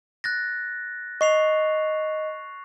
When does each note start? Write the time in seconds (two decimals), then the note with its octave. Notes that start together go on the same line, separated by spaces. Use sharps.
0.24 F#6 A6 A#6
1.21 D#5 C#6 C7 F7